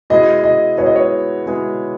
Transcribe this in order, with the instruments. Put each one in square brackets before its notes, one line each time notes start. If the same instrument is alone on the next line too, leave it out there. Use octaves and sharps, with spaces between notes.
[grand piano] B2 G#3 B3 E4 G#4 [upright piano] D#5
[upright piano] D#5
[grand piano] B2 G#3 B3 E4 G#4 [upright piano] C#5
[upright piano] D#5
C#5
[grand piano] B2 G#3 B3 E4 G#4